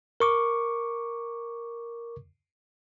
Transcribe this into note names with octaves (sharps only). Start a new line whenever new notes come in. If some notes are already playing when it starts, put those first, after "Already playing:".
A#4 C#6 D6